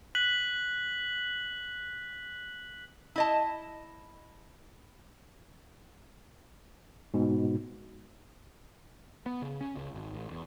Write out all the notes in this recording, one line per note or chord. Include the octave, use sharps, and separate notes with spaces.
F#6 B6 F#7
E4 D#5 A5
G#2 B2
B3
C#3
C#4
C#2
G#1
A1
E2